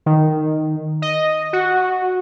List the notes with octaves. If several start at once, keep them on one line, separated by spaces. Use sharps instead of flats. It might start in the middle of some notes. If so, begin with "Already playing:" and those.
D#3
D#5
F#4